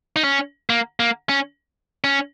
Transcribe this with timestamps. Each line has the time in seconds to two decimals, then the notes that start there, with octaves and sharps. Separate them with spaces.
0.16 D#4
0.24 C#4
0.70 A#3
1.00 A#3
1.29 C#4
2.04 C#4